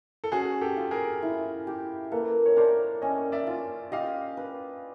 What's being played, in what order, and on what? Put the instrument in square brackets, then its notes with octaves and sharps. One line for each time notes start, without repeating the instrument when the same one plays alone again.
[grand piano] A4
[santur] C#4 [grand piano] F#4 G#4
[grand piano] G4 A4
[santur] F4
[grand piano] G#4 A#4
[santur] E4
G4
[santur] A#3 [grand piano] A4 B4
[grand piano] C#5
[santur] D4 [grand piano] A#4 C5
[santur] C#4 [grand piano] C#5 D#5
[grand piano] D5 E5
[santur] F4
[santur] G4 [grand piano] D#5 F5
[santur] B4